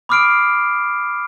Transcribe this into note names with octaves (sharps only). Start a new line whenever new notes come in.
B5 D6 D#6 F6 C7 D7